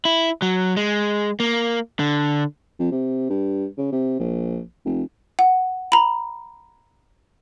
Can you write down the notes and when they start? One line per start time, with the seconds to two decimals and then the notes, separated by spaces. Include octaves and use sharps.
0.05 E4
0.42 F#3
0.77 G#3
1.40 A#3
1.99 D3
2.79 F2
2.92 C3
3.30 G2
3.78 C#3
3.92 C3
4.19 A#1
4.85 F1
5.39 F#5
5.92 A#5 B5